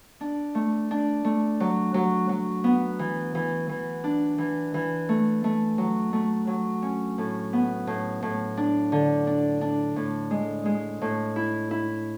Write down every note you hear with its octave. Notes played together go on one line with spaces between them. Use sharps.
D4
A3
D4
A3
F#3
F#3
F#3
B3
E3
E3
E3
D4
E3
E3
A3
A3
F#3
A3
F#3
C#4
A2
B3
A2
A2
D4
D3
D4
D4
A2
G#3
G#3
A2
E4
E4